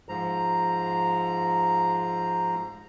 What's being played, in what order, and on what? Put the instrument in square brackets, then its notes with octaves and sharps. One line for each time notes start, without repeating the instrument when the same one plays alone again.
[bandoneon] G#2 F3 A#5